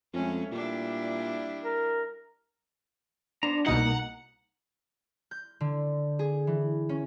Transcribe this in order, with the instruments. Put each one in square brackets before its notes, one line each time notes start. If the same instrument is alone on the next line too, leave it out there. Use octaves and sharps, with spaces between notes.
[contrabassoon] F2 [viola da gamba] G#3 A3 C#4
[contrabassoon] A#2 [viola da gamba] G3 D4 E4
[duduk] A#4
[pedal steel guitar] B3 C5 A#5 [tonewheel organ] D4
[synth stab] C2 B2 D#4 [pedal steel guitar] A#3 [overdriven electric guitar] F#5 [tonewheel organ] A#5
[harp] G6
D3
G#4
E3
C#4